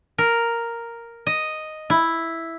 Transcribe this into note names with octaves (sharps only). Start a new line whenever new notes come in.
A#4
D#5
E4